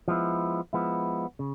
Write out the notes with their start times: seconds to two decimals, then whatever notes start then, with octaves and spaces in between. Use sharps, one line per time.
0.08 F3 G#3 B3 E4
0.73 F3 G#3 B3 E4
1.39 C#3